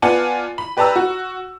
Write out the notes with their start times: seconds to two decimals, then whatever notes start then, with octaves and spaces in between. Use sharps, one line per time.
0.02 B3 F4 D5 F#5 G#5 A5
0.58 B5
0.77 G4 B4 D5 A5 A#5 E6
0.96 F#4